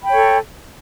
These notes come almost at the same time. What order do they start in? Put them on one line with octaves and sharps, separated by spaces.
B5 G5 C#5 A4